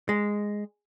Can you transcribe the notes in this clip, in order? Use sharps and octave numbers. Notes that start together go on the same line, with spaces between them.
G#3